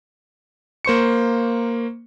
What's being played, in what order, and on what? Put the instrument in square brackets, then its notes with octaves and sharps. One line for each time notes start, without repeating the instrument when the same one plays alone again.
[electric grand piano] A#3 C5 C#6 C#7